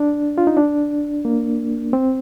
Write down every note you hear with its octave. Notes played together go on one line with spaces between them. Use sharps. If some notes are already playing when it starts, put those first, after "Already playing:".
Already playing: D4
F4
D#4
D4
A#3
C4